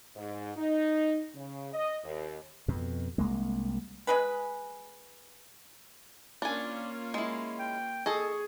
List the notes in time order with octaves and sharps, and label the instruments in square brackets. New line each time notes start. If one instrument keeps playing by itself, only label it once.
[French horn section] G#2
D#4
C#3
D#5
D#2
[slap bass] F2 B2
C2 G#3 A#3
[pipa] G#3 G#4 B4
[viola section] A#3 C#4 F4 [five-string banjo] D4 G#5
[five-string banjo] G#3 E4
[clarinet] G5
[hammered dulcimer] G#4 [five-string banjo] A4 D#5 [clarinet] C#6